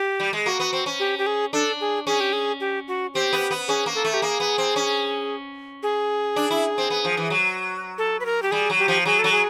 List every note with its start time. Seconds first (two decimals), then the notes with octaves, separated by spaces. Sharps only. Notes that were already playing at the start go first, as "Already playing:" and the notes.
Already playing: G4
0.20 G3
0.33 G#3
0.46 A#3 F#4
0.60 B3
0.73 C4
0.86 C#4
1.00 G4
1.18 G4
1.27 G#4
1.53 D4 A4
1.81 G#4
2.07 C#4 G#4
2.20 G4
2.33 G#4
2.61 G4
2.88 F#4
3.14 C4 G4
3.33 B3
3.51 B3
3.68 C#4 G#4
3.86 A#3
3.95 A4
4.05 A3
4.14 G4
4.22 A#3 G#4
4.40 B3
4.58 C4
4.76 C#4
5.83 G#4
6.36 D4
6.51 E4
6.78 C4
6.90 B3
7.05 F3
7.17 E3
7.30 F#3
7.98 A4
8.20 B4
8.26 A#4
8.43 G4
8.51 G3 G#4
8.70 F#3
8.79 G4
8.88 F3
9.05 F#3 G#4
9.19 A4
9.24 F#3
9.31 G#4